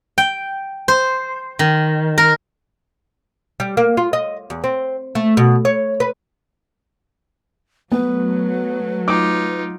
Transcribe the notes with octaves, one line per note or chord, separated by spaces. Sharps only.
G5
C5
D#3
A#4
G3
A#3
F4
D#5
E2
C4
A3
B2
C#5
B4
F#3 A3 B3 B4
D#4 F4 D6